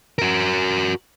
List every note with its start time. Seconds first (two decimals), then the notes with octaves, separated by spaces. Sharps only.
0.19 F#4 A#4